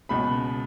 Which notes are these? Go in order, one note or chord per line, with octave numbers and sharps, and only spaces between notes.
C#2 B2 B5